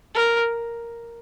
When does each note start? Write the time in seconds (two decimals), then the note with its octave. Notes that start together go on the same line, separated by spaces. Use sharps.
0.15 A#4